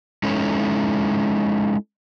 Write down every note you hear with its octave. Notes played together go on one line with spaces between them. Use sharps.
G#3 C#4 D#4 E4 A4 C#5